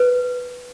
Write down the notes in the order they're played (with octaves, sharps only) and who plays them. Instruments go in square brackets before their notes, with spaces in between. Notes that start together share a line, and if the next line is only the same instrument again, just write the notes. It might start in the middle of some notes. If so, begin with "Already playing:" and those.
Already playing: [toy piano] B4